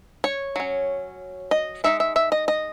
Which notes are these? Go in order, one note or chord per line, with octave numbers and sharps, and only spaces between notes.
C#5
F#3 C#4
D#5
G#3 D#4 E5
E5
E5
D#5
D#5